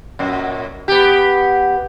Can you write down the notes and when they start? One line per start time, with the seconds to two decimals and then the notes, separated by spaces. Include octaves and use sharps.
0.19 F#2 A#2
0.88 B3 G4